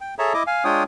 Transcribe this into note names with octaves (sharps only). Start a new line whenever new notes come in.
G5
G#4 A4 C#5 E5 A5 A#5
E4 D#5 D6
F5 G#5
G#3 D4 F4 C#5 G5 D#6